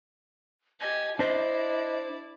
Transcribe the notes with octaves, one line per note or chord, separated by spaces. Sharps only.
G4 D#5 G#5
D4 E4 C5 D5 D#5